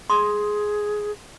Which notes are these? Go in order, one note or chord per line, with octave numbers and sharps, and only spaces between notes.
G#4 C6 D#6